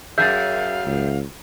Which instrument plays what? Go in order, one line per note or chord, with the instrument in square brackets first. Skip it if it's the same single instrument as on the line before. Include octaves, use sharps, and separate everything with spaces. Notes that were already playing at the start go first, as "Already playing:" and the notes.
[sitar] F#2 G#4 E5 [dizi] F5 [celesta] G6 A6
[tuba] C#2